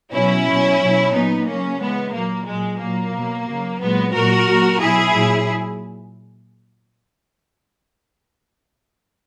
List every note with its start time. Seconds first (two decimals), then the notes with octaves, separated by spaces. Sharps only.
0.12 B2 F#3 C#4 E4
0.46 B2 F#3
0.79 B2 F#3
1.12 A#2 F#3 B3 D#4
1.46 C#3 F#3 A#3 C#4
1.79 C#3 E3 G#3 B3
2.12 A#2 F#3 A#3
2.46 A#2 F#3 G#3
2.79 A#2 F#3 A#3
3.13 B2 F#3
3.46 C#3 F#3
3.79 A#2 F#3 G#3 B3
4.13 A#2 F#3 F#4 A#4
4.47 A#2 F#3
4.80 B2 F#3 E4 G#4
5.13 A#2 F#3